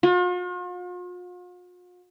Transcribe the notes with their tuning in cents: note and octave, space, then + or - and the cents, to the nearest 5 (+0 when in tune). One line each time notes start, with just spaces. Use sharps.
F4 +45